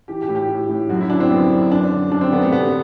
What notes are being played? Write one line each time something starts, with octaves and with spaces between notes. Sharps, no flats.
E3 G4
G4
A2
G4
A2
A2
F#2 F#4
E4
D3 D4
C4
F#2 B3
F#2
F#2 D4
D3
F#2 D4
C4
D3 B3
A3
C3 B3